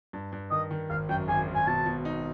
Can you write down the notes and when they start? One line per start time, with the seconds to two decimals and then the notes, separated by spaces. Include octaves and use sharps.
0.13 G2
0.33 G2
0.51 D#3 D#5
0.71 D#3
0.90 G#1 F5
1.09 F#2 G5
1.28 G#1 G#5
1.48 G#1
1.55 G#5
1.67 B2 A5
1.86 B2
2.05 D#4